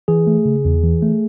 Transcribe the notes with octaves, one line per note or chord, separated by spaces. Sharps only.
E3 G#4
A3
C#3
E2
E3
A3